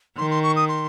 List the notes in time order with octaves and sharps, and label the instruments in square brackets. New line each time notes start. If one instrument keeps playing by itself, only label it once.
[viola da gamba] D#3 [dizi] C6
[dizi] C6
C#6
D#6
C6